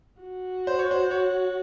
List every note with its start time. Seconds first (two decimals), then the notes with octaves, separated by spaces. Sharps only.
0.22 F#4
0.67 C5
0.79 C#5
0.91 C5
1.11 C#5